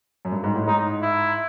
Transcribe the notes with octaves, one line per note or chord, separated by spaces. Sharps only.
F#2
G2
G#2
A2
G#2 D#4
E4